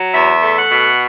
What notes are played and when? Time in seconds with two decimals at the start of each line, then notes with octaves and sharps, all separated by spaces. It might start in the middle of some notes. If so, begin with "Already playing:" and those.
Already playing: F#3
0.14 E2 E5
0.42 A3
0.56 F#5
0.71 B2